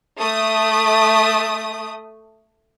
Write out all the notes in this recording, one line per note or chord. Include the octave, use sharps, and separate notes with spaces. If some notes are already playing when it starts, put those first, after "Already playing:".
A3 D#6